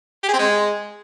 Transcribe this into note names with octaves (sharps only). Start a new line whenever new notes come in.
G4
G#4
C4
G#3